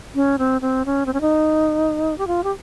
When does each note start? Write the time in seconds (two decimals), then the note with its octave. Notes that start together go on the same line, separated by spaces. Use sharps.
0.15 C#4
0.39 C4
0.61 C4
0.86 C#4
1.06 C4
1.13 C#4
1.21 D#4
2.18 G4
2.27 F4
2.44 G4